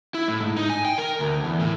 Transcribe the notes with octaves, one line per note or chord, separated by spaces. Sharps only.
E4
A2
G#2
D#4
G#5
G5
A#4
D2
E2
A2